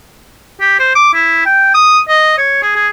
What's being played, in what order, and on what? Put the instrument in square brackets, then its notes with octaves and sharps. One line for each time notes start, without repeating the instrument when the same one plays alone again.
[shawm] G4
C5
D6
E4
G5
D#6
D#5
C#5
G#4
G#4